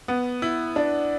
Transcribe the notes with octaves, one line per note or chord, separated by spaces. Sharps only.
B3
E4
D4